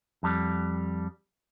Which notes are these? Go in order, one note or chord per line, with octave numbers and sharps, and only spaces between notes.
F2 G3